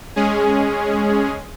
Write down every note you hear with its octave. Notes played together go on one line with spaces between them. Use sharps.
G#3 C#4 G#4